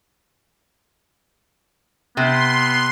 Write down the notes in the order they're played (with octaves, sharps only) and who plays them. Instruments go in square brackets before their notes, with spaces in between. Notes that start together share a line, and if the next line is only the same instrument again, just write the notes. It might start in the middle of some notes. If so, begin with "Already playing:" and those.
[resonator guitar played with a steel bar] C3 [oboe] B3 [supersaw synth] C6